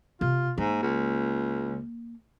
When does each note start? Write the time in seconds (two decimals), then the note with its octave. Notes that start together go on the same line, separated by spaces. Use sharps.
0.21 C3 F4
0.58 G#2 A#3
0.83 C#2